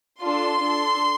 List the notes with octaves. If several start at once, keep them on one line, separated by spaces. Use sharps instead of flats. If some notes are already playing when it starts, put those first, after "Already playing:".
D4 F4 A4 C6
D4 A4